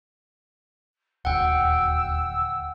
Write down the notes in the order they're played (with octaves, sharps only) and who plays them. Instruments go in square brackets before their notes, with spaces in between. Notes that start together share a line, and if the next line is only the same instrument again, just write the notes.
[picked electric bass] D#1 D2 [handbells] F#5 G5 [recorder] E6